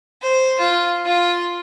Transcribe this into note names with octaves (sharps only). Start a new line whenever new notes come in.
C5
F4
F4